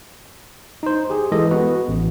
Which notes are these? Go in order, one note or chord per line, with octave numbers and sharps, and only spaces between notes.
D#4 C5
G4 G#4
E3 G#3 A4 D#5
B3 F#4 B4
A1